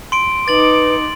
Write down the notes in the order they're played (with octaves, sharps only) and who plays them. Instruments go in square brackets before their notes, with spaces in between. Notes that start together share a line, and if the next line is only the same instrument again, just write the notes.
[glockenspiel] C6 D7
[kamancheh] D#4 D6 [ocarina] B4 [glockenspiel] A6 F#7